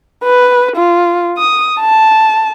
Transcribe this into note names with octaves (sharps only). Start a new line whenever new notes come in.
B4
F4
D#6
A5